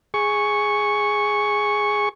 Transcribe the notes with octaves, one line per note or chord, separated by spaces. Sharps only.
G#4 C#6